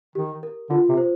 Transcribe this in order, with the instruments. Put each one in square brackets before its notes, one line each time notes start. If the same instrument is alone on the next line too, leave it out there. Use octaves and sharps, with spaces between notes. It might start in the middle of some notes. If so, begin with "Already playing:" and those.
[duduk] D#3 [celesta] G4
[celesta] A#4
[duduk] D3 [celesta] F4
[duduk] C3
[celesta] C5